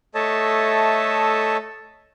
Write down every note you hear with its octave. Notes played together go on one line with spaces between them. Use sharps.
A3 A4 C#5 D#5 E5 A5